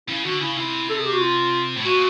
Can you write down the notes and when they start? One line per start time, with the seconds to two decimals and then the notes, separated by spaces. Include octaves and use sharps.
0.09 C#3 E4
0.25 D3 F#4
0.40 C#3 E4
0.57 C3 E4
0.90 A4
0.98 G#4
1.06 G4
1.13 F#4
1.20 F4
1.76 A2
1.85 A#2 F#4